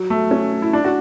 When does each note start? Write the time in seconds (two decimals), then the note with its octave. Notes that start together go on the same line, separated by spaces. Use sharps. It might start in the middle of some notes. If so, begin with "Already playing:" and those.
Already playing: F#3
0.10 A3
0.31 C#4
0.62 E4
0.73 D4
0.85 F#4